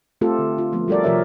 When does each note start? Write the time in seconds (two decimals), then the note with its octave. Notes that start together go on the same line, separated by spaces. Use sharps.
0.21 A3 C4 F4 G4 A4
0.39 D3
0.58 F4
0.73 F3 A3 B3
0.88 G3 F#4 A4 A#4 D5
1.04 C3 F3 G4 A#4 C#5 E5